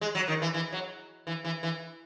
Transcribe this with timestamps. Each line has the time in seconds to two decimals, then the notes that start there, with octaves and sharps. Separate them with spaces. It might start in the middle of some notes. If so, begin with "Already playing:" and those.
0.01 G#3
0.15 F#3
0.28 D#3
0.42 E3
0.54 E3
0.72 F#3
1.27 E3
1.45 E3
1.63 E3